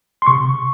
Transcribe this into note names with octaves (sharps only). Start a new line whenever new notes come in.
C6
C3 C#6